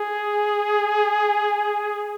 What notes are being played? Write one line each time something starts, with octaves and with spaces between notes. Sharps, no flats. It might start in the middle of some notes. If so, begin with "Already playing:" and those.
Already playing: G#4